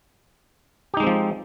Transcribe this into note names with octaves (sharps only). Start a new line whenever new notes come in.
F3 G#3 C4 D#4 G4